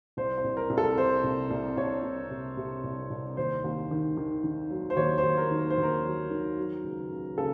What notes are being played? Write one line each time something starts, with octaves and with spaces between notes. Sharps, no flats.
C2 C5
C5
C2
A#4
C2
A4
C3 C5
C2
C2
C2 C#5
C2
C3
C3
C2
C2
D#2 C5
D#2
D#3
D#3
D#3
F#3
C5
D#2 C#5
C5
D#2
A#4
D#3
A#4
C5
D#2
A#4
F#3
D#3
F#3
C#2
C#2
C#3 A4